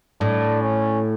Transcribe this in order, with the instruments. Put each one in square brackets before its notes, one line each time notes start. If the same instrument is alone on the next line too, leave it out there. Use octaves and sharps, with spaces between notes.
[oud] A2 [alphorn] D4
[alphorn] C#4